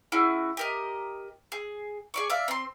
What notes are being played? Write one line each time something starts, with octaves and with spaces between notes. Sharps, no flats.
C#4 E4 F#4 G#4
G4 A#4 D#5
G#4
G#4 D5 C#6
D5 E5 F5
C4 C6